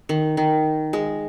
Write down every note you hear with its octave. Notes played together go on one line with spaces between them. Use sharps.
D#3
D#3
G#3